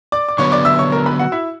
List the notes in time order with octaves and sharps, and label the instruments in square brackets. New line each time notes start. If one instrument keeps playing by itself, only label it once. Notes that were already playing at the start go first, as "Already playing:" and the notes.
[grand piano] D5 D6
D6
[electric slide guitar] D3 F#3 B3 [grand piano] C#5 C#6
[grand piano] D5 D6
E5 E6
C#5 C#6
A#4 A#5
B4 B5
F#4 F#5
E4 E5